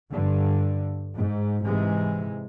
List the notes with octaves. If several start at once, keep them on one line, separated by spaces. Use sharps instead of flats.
G2 D3
G#2
G#2 C3 E3 G#3